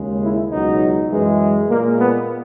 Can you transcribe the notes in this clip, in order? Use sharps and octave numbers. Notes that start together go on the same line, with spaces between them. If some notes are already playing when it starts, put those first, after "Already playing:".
Already playing: D#2 C#3 G#3
E4
C#2 B2 F#3 D#4
F#2 E3 G#3
A#2 G#3 A#3
B3